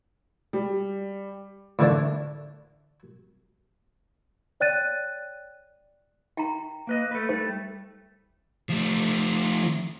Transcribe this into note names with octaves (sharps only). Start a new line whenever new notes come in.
G3
A2 D3 E3 D4
C#5 D5 G5 F#6 A6 D#7
G5 A#5
A#3 B4 D#5
A3 B4
G3 A3 C5
F3 A3